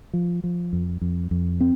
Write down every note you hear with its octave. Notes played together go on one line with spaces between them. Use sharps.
F3
F3
F2
F2
F2
C4